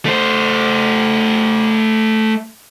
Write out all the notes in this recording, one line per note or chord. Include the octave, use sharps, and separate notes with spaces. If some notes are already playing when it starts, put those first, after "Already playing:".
A3 C5